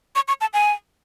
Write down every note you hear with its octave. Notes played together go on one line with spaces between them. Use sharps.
C#6
C#6
A5
G#5